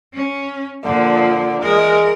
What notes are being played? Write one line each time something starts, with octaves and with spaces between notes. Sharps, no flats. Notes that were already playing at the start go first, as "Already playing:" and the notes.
C#4
A#2 D3 F3
E3 G#3 A#4